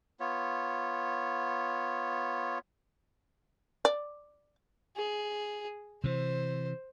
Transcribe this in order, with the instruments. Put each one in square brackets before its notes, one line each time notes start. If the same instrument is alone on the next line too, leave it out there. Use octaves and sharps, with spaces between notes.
[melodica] B3 F4 C#5
[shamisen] D5
[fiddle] G#4
[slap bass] C3 E3 [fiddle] C5